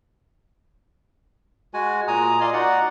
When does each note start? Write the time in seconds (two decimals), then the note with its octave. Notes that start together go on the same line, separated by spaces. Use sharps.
1.74 G#3 F#4 G#5
2.08 A#2 G#5 A#5 D#6
2.41 D5 D#5 F5 C6
2.53 D#4 F#4 D5 F#5